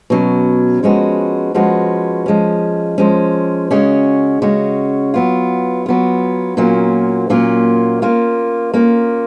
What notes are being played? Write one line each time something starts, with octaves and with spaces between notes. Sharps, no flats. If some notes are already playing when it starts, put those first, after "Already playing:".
B2 F#3 C#4
F3 G#3 C#4 F#4 B4
F3 G#3 C#4 F#4 B4
F3 G#3 C#4
F3 G#3 C#4
C#3 G#3 C#4 F#4 C#5
C#3 G#3 C#4 F#4 C#5
F#3 B3 F4
F#3 B3 F4
A#2 F#3 A#3 C#4 F4
A#2 F#3 A#3 C#4 F4
A#3 C#4 F4
A#3 C#4 F4